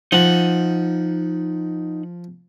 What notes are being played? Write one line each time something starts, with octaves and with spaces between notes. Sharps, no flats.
F3 D#4 F#5